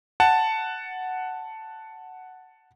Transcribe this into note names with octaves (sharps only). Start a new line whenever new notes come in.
F#5 A5